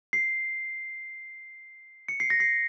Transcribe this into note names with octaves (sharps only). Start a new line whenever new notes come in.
C7
C#7
C7
A#6
C7